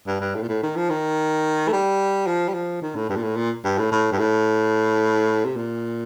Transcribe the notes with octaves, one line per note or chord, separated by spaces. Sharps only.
G2
G2
A2
A#2
A2
D#3
F3
D#3
A3
G3
F3
G3
F3
D#3
A2
G2
A#2
A2
A#2
G2
A2
A2
G2
A2
C3
A#2